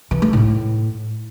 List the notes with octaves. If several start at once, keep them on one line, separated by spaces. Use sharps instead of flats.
E3
A3
A2